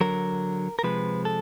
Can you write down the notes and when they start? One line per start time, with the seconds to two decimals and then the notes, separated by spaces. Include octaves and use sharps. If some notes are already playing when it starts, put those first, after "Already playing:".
0.01 D3 F#3 A#4
0.79 A#4
0.83 C3 F3 G#3 B4
1.25 A4